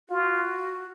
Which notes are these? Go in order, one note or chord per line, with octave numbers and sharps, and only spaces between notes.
F4 F#4